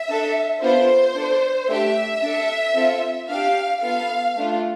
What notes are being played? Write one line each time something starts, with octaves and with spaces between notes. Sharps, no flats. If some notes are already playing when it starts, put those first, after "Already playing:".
Already playing: E5
D4 A4
B3 D4 F4 A4 C5
D4 A4
A3 D4 G4 E5
D4 A4
C4 F4 A4
D4 G4 F5
B3 F4 A4 F5
A3 D4 F4